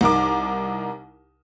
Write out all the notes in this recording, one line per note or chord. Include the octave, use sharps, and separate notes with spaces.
C2 D#4 A#4 D6